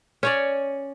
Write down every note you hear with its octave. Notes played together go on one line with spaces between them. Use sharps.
C#4 C#5 D5